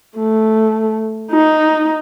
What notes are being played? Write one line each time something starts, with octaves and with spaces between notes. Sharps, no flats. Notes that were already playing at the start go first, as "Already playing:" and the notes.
A3
D#4